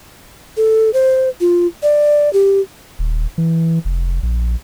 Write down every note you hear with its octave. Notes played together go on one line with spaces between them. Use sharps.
A4
C5
F4
D5
G4
D#1
E3
F1
A#1